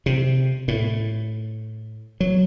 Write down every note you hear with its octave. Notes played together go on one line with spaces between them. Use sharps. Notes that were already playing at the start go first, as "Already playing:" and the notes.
C3
A2
F#3